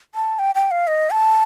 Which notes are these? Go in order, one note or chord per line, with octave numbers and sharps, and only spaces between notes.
A5
G5
G5
F5
D#5
A5